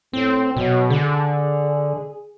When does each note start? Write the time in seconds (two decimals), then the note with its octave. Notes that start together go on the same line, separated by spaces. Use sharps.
0.13 A2 C4
0.57 B2 F#3
0.90 D3 G#4